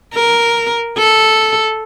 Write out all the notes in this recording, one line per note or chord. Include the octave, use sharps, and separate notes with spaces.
A#4
A4